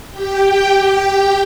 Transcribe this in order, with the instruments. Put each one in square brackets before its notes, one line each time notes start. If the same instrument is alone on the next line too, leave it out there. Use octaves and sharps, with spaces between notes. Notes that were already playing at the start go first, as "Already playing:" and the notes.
[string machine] G4 G5